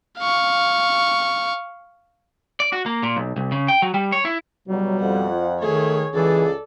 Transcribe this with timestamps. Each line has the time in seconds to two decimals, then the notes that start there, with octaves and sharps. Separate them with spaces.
0.19 F5 C#6
2.60 D5
2.73 F#4
2.86 A#3
3.03 A#2
3.17 B1
3.36 C2
3.52 C#3
3.68 G5
3.82 F#3
3.94 G3
4.12 C#5
4.25 E4
4.68 C#2 B2 F#3 G3
5.00 F2 F#5
5.31 F4
5.62 D#3 A3 G#4 C#5
6.14 C#2 E3 G#4 A4 D5